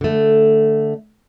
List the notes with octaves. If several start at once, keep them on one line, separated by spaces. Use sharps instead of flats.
D3 A3